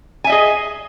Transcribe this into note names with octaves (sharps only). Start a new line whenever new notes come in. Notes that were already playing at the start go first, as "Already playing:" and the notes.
G#4 D#5 E5 G#5